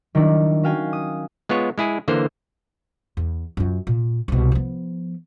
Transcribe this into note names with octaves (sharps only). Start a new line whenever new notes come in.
D#3 F#3 G3 D4 E4
C#4 F#4 F5 G5 G#5
D#6
G#3 B3 F4 C#5
G#3 E4 G#4
D3 E3 A#3 C5
E2
F#2 F4
A#2
C2 B2
F3 B3